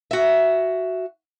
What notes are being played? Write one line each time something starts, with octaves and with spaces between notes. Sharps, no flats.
F#4 E5